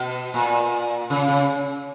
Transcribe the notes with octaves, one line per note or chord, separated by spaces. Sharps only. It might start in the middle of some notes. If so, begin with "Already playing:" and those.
Already playing: B2
A#2
C#3
C#3